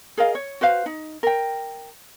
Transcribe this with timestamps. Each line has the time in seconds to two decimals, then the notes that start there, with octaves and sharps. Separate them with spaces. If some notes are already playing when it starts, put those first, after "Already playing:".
0.18 G#4 A#4 D#5 F5
0.35 C#5
0.61 F#4 B4 C5 F5
0.86 D#4
1.23 A#4 G5